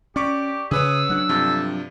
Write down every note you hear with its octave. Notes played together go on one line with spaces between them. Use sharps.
C#4 G4 D5 C#6 D6
C#3 G#4 B4 C#5 D#6 E6
F#3 D4 F#5
G2 C3 F3 A4